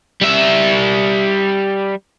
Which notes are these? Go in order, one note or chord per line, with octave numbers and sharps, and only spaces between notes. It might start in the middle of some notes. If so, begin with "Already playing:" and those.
G3 E5